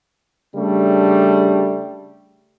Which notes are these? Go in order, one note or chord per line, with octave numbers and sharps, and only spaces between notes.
C#3 G3 A3 D4